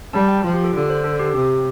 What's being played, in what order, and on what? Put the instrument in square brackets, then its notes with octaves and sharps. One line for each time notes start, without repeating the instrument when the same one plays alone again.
[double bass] G3 [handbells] A5
[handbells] G5
[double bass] F3 [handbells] F4
[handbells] G4
A4
[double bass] D3 [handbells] A4
[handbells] C5
A4
G4
[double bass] C3 [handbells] G4